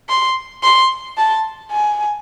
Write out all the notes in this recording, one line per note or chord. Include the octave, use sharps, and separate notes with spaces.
C6
C6
A5
G#5